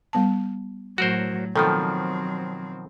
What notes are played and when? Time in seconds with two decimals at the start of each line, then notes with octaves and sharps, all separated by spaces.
0.13 G3 B3 A5
0.98 A2 F#3 F#4 A#4 C5
1.56 B2 D#3 F3 F#3 C4 A4 G5